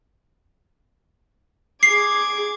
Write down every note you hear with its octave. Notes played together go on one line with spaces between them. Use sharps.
G#4 D6 G#6 C7